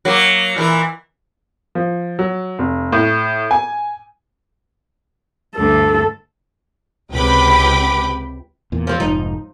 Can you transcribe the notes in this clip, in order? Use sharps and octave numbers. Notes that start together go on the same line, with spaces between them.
F#3 A#3
A#2 E3 A#4
F3
F#3
F1
A2
G#5
D2 G2 A4
C#2 C3 B4 G5 B5 D6
E2 A#2
F3 C4
F1 G#2 F3 D#4